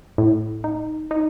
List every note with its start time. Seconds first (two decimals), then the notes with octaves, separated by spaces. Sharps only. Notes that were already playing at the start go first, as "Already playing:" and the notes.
0.18 A2
0.64 D#4
1.11 D#4